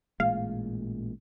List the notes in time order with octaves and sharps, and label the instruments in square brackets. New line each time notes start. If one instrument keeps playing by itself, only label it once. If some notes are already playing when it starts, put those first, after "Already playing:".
[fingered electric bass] A1 A#2 G#3 [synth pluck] F5